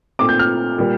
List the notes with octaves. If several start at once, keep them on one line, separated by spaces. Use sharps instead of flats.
A#2 A3 C4 D6
G6
F6
A#2 G3 A#3